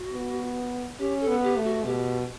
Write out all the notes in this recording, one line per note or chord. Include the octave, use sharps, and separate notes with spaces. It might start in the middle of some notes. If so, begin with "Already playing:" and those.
Already playing: F#4
B3
C#4 G4
A4
B3
G4
A3
F#4
B2 G4